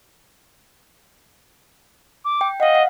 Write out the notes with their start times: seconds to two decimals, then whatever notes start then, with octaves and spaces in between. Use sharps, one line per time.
2.25 D6
2.41 G5
2.60 D#5 F5 F#5
2.75 F#5